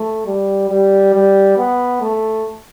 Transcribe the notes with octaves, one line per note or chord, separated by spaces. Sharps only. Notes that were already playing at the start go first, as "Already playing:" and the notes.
Already playing: A3
G3
G3
G3
B3
A3